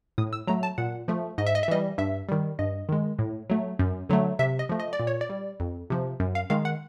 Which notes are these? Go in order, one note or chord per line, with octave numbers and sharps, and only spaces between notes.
A2 D#6
E6
F#3 A3 A#5
A5
A#2 F#5
F3 A3
G#2 D#5
E5
D#5
E5
E3 G3 D#5
G2 E5
D#3 G3
G2 D#5
D#3 G#3
A2
F#3 A3
F#2
D3 F#3 A3
C3 E5
D#5
F3 A3
D#5
D5
A#2
C#5
D5
G3
F2
C3 F3
F#2
F5
D#3 G#3 F5
F#5